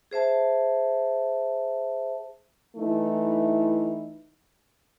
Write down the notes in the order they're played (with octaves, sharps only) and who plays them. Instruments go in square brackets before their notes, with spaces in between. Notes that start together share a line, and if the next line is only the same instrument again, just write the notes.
[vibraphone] G#4 C5 E5 A5
[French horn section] E3 A3 D#4 E4